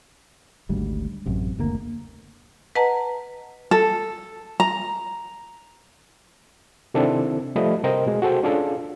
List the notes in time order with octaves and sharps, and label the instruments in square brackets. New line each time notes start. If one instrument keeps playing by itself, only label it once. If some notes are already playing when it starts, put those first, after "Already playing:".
[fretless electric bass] G#1 D2 G#2 G3
A1 F#2 C3
F#1 D2 A2 A#3
[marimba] B4 D#5 F#5 A5 A#5
[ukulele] A4
A#5
[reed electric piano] C3 D#3 C4 D4 E4 A4
F3 G3 A3 D#5 B5
C3 A#4 C5 D#5 G5
B2 G#3
F#4 G#4 A4 C5 G5
C#4 D4 F4 G#4 A4